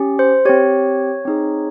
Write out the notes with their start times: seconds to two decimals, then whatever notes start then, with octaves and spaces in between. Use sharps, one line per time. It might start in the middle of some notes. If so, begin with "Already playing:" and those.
Already playing: C#4 G4
0.19 C5
0.45 C4 G4 C#5
1.25 C4 D#4 G#4